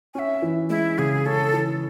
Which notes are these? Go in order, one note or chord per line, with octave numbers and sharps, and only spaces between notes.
C#4 E5 G#5
E3
G#3 E4
C#3 G#4
C#4 A4
E3